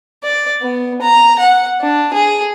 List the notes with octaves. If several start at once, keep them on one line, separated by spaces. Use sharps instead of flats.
D5
B3
A#5
F#5
D4
G#4